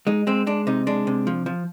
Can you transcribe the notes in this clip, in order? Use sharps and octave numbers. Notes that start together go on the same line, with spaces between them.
G#3 D#4
G#3 C4
G#3 D4
C3 D#4
G#3 D4
C3
F3
F3